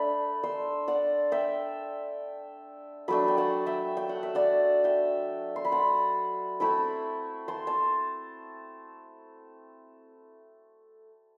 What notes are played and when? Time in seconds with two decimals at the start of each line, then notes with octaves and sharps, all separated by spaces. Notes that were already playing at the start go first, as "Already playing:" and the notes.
Already playing: A3 D4 B5
0.43 C6 E6
0.88 D5 F#5
1.32 E5 G5
3.08 F#3 A3 D4 B5 D6
3.28 G5
3.37 F#5 A5
3.66 E5 G5
3.97 G5
4.09 F#5
4.23 E5
4.35 D5 F#5
4.84 E5 G5
5.56 C6
5.65 B5
5.72 F#5 A5
6.60 A3 C4 E4 B5 D6
7.48 A5 C6
7.67 A5